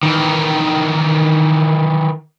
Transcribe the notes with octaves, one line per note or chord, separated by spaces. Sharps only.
D#3 E3